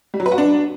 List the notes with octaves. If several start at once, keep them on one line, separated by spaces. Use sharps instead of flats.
G3
F#3
B4
F#4
D4